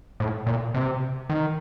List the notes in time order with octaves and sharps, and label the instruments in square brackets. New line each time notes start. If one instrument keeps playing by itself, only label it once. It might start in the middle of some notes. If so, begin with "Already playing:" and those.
[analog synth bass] A2
A#2
C3
D#3